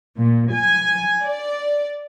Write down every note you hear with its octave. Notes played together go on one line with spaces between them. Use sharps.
A#2
G#5
D5